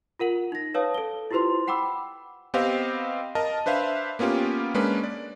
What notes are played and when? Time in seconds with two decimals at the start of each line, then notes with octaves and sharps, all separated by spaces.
0.19 F4 A#4 F#5 F#7
0.52 D#4 A#6
0.74 B4 C#5 F5 A5 D#6
0.94 A4 G7
1.31 E4 F4 G4 B4 C5 C6
1.67 F#5 G5 B5 D6 E6
2.54 B3 C4 G4 C5 D#5 F5
3.35 A#4 D#5 A5
3.66 D4 B4 C5 E5 F5
4.19 A#3 B3 C#4 F4 G4
4.75 G#3 A#3 C#4 D4 B4
5.04 D5